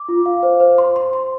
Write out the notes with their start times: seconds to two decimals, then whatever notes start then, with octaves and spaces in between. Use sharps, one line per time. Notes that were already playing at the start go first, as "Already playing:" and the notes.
Already playing: D6
0.09 F4
0.26 F5
0.43 C5
0.60 C5
0.78 C6
0.96 C6
1.13 C6